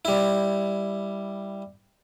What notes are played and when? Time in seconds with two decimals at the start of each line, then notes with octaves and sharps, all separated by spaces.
0.05 G3 E4